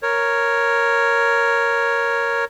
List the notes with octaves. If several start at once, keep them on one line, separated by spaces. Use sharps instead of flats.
A#4 C#5